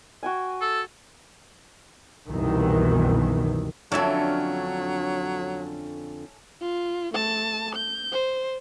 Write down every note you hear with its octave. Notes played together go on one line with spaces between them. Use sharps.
F#4 G5 G#5
A4
C2 F#2 B2 D#3 E3
F2 D3 F#3 C#4 D4 A4 E5 G#5
F4
A3 A5
G6
C5